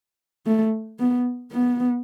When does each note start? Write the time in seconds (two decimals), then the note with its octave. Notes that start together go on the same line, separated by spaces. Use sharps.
0.46 A3
0.99 B3
1.52 B3